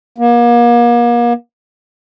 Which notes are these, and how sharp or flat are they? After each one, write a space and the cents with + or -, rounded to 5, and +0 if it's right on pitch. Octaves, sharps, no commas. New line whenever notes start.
A#3 +35